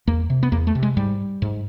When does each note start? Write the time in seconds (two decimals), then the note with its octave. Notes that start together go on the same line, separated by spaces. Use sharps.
0.07 E2 A#3
0.30 C3
0.43 B3
0.52 E2 A#3
0.67 A3
0.75 C3
0.83 G#3
0.97 G#2 G3
1.42 G#2